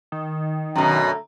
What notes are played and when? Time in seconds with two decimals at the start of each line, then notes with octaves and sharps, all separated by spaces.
0.12 D#3
0.76 F#2 B2 D3 A3 A#5